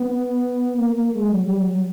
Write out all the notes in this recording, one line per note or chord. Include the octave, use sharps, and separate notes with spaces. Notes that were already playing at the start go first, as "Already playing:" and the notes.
Already playing: B3
A#3
A#3
G#3
F#3
G3
F#3
F#3